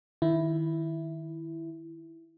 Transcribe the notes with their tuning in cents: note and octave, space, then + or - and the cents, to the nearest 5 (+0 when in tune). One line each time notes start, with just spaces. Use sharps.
D#3 +10 E4 +0